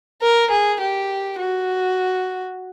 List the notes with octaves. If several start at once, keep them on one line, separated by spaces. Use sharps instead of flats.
A#4
G#4
G4
F#4